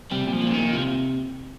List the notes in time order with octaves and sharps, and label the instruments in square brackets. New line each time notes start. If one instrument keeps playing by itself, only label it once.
[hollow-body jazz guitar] C3 [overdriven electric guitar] G3
[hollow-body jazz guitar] A#2
[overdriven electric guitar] F3
[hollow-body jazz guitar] A#2
[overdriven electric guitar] C#3
[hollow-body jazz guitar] A#2 [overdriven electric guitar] D#3
[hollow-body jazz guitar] C3 [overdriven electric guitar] F3